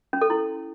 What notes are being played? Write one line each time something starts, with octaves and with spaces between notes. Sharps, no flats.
C#4
A4
E4